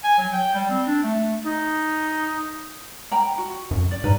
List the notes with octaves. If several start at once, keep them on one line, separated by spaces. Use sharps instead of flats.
G#5
F#3
G5
G3
C4
D4
A3
D#4
G5 A#5 B5
F#4
F#2
D5
G#2 B4 A#5